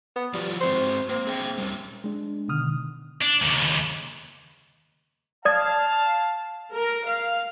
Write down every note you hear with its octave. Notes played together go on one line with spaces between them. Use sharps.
B3
F3 G3 F4 F#4
G#3 C4 F#4 C5
A#3 C4
G#4 E5 G5
G3 B3 C#4
G#3 D4
B2 D3 D#3 D#6 F6
D4
D#2 C#3
D5 F5 A5 D#6 G#6
A#4
F5